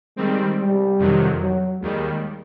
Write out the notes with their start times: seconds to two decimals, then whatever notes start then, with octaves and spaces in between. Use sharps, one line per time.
0.17 D#3 G3 G#3 C4
0.59 G3
0.99 F2 C3 D#3 F#3
1.41 F#3
1.81 D#2 D#3 G3 G#3